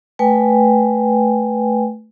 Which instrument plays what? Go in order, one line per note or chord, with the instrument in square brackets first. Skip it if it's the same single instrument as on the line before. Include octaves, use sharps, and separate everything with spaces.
[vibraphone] A3 B4 G5 G#5